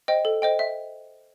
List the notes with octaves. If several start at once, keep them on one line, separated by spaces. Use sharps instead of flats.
C5 D#5 G5
A4
C5 D#5 G5
E5